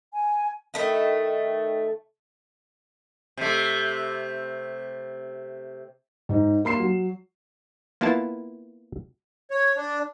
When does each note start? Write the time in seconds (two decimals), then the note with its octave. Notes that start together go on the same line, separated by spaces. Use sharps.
0.13 G#5
0.74 D#3 A3 E4
3.37 C3 A3
6.29 G#2 D#4
6.65 A#3 C6 C7 E7
6.80 F#3
8.01 A#3 B3 E4 F4 A5
9.51 C#5
9.77 D4